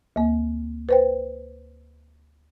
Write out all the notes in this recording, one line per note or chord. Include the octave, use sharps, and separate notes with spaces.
D2 A#3
B4 C5 G5